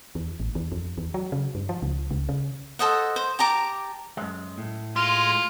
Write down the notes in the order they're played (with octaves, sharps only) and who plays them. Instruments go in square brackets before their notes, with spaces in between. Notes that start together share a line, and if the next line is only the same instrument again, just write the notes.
[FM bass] E2
A1
E2
F2
E2
F#3
C#3
G2
F3
C#2
C#2
C#3
[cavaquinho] A4 C5 D#5 F#5
C5
G4 A5 A#5 D6
[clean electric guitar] F#2 G#3
A2
[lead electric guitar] G#3 [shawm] F4